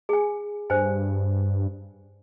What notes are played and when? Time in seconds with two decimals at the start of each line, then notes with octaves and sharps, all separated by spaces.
0.09 G#4 G#5
0.70 G2 C5 G#5